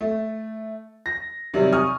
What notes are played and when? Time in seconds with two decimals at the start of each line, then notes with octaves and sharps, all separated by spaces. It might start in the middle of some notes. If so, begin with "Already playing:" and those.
0.01 A3
1.06 A#6
1.54 C3 D#3 F#3 G3
1.72 G#5 C#6 D#6 F6